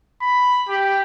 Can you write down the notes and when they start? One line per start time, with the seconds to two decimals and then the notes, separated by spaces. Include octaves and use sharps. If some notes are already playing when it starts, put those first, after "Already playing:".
0.21 B5
0.69 G4